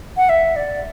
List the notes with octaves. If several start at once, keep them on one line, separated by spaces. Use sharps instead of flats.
F#5
E5
D5